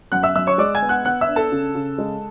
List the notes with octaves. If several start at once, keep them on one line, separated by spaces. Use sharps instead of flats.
F#2 F#5 F#6
E5 E6
F#2 E5 E6
C#5 C#6
G#3 D5 D6
G#5 G#6
B3
F#5 F#6
B3 F#5 F#6
E5 E6
D4
A4 A5
C#3
C#3
G#3